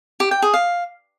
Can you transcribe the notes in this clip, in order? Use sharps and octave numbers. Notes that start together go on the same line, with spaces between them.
G4
G5
G#4
F5